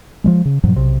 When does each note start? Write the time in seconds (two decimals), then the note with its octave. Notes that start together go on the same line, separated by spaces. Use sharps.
0.24 F3 G3 G#3
0.45 C#3
0.64 G2 A#2 F3 F#3
0.76 B1 C3